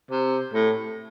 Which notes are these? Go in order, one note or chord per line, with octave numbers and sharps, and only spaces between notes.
C3
A2